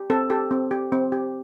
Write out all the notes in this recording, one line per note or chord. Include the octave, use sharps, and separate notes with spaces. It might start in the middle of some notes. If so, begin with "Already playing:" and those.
Already playing: G4
C4 A4
G4 A4
C4
G4
C4
G4